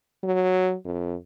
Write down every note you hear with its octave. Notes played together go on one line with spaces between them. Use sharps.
F#3
F2